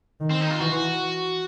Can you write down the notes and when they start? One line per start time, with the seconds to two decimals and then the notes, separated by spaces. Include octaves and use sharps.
0.20 D#3
0.30 C4
0.41 D#4
0.51 F4
0.60 E3 F#4